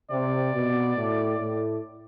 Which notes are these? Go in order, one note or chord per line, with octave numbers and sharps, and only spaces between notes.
C3 D5
B2
A2
A2